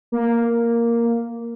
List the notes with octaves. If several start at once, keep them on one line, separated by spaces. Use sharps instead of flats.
A#3